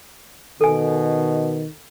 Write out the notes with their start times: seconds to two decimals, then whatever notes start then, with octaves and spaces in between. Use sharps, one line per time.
0.61 B2 D#3 A4 G#5